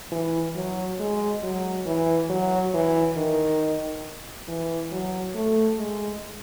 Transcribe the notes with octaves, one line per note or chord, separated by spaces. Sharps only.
E3
F#3
G#3
F#3
E3
F#3
E3
D#3
E3
F#3
A3
G#3